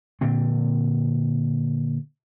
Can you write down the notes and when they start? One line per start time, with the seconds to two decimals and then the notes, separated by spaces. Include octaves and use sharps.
0.21 A#2 D3 C4